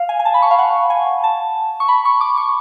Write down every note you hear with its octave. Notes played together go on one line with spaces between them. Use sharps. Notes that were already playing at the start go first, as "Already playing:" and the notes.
Already playing: F5
G#5
G#5
A5
B5
C#6
F5
F#5
G#5
A5
C#6
B5
C#6
D6
C#6